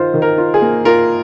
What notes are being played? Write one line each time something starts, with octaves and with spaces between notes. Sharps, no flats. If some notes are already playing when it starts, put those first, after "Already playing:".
Already playing: D#3 F4 C5
D#3
A#4
F4
G#4
A#3
F4 A#4